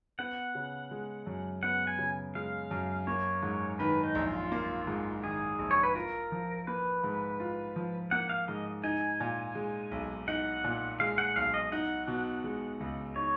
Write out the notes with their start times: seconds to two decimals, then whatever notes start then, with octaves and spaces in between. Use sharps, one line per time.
0.19 B3 F#5
0.55 C#3
0.91 G#3
1.26 F#2
1.63 B3 F#5
1.87 G#5
1.99 C#3
2.35 G#3 F5
2.71 F#2
3.07 A#3 C#5
3.42 G#2
3.79 D#3 B4
4.03 D#4
4.15 A#1
4.27 F4
4.52 A#3
4.87 G#2
5.24 D#3 G#4
5.59 A#1
5.71 C#5
5.83 B4
5.95 F4 A#4
6.32 F3
6.67 A#3 B4
7.04 G#2
7.40 F4
7.76 F3
8.11 A#3 F#5
8.29 F5
8.48 G#2 D#5
8.83 D#4 G#5
9.20 A#2
9.55 G#3
9.91 B1
10.28 D#4 F#5
10.64 A#2
11.00 G#3 F5
11.18 F#5
11.36 B1 F5
11.54 D#5
11.72 D#4 F#5
12.08 B2
12.44 G#3
12.80 C#2
13.16 D#4 C#5